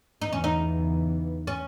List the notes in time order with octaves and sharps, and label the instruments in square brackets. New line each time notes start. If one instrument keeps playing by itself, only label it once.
[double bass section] E2 C#3 E3 B3 [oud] D#4
[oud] C#4
D#4
C#4